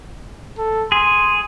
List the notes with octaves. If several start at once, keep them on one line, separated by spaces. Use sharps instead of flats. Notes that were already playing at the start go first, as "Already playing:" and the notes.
A4
G#4 C6